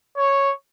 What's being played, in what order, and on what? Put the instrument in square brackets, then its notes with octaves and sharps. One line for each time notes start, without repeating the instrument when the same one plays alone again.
[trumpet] C#5